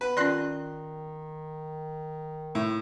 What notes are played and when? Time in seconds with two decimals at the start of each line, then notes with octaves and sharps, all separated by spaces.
0.01 B3 B4
0.17 D#3 C#4 F4 D5 C6 F#6
2.55 A2